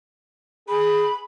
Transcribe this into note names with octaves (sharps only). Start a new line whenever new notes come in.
G#4 B5